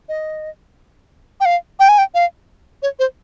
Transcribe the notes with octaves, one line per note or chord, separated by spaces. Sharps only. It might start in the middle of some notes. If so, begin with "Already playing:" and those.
D#5
G5
F5
G5
G#5
G5
F5
C#5
C5